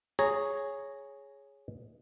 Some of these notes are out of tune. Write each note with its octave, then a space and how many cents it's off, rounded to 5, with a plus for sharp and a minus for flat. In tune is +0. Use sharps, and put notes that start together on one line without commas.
G#4 +0 C#5 +0 A#5 -10